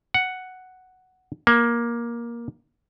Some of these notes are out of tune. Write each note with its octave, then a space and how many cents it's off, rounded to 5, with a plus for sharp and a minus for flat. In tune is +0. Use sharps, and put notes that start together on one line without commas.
F#5 +5
A#3 +15